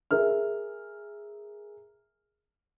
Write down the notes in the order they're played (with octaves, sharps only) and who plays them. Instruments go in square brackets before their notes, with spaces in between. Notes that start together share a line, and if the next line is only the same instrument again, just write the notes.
[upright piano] G#4 A#4 E5 F6